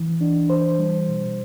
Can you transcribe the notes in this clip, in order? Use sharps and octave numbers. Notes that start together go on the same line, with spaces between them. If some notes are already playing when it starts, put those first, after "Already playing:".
Already playing: E3
D4
E3 C5
G3
B2